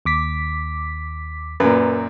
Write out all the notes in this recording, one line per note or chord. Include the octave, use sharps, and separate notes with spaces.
D#2 D6 B6
F#2 A#2 B4